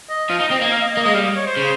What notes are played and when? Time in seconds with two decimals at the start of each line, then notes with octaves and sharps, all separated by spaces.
0.09 D#5
0.30 F3 F5
0.40 D#4 D#5
0.51 C4 D#5
0.61 A#3 D#5
0.72 F5
0.82 D#5
0.94 D#5
0.97 A#3
1.04 G#3 D#5
1.14 G3 F5
1.36 C#5
1.46 C5
1.57 C#3